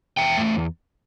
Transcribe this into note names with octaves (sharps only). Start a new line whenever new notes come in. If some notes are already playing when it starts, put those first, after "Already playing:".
E2 E5 G5
A3